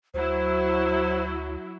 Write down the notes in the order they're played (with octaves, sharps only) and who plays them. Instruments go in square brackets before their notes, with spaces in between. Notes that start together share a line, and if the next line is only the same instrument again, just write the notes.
[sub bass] D2 [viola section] F#3 E4 [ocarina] C5